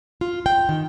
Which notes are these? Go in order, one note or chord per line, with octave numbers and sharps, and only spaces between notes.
F4
G5
D#3